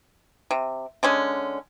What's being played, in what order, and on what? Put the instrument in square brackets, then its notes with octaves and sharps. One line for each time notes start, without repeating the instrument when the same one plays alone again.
[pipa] C3
D3 G#3 C#4